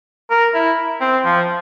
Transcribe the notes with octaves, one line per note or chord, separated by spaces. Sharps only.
A#4
E4
C4
F3